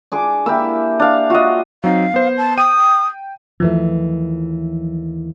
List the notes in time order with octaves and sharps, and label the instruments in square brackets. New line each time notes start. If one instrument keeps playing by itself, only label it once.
[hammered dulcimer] D4 G#4 D6
[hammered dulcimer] A#3 E4 G4 [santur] E6
[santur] D4 F5
[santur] F4 D#5 [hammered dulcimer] F#4 F5
[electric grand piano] F#3 C4 D#4 [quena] F5
[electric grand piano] B3 C5
[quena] A5
[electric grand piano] G5 D#7 [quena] D#6
[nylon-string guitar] D#2 E3 A3 [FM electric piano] F3